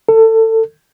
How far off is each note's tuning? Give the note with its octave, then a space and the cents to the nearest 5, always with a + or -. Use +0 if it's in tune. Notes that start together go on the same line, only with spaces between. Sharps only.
A4 +25